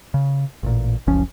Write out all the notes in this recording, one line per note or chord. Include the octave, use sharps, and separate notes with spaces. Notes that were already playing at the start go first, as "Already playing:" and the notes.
C#3
A1 A#2
F#1 C#2 F3 C#4